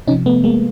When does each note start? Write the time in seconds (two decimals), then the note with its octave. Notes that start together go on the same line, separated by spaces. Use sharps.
0.07 C3 C#4 D#4
0.11 F3
0.26 A3 B3
0.44 G#3 A#3